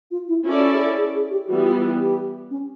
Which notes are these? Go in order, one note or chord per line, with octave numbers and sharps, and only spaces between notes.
F4
E4
C#4 E4 F4 A4 D5
F#4
G#4
A4
G#4
G#4
G4
E3 G3 B3 F#4
F4
G4
C#4